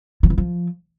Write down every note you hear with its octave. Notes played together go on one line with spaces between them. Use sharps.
F3
E3
F3